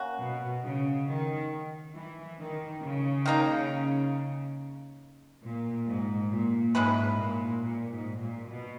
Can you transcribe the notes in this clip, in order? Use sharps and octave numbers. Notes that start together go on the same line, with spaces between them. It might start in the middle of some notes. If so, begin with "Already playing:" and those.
Already playing: A#3 C#4 F#4
B2
C#3
D#3
E3
D#3
C#3
D#3 A#3 D#4
A#2
G#2
A#2
G#2 G#3 C#4 E4 B4
A#2
A#2
G#2
A#2
B2